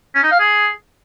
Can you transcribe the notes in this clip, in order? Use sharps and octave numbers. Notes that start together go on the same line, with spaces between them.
C#4
D#4
F5
G#4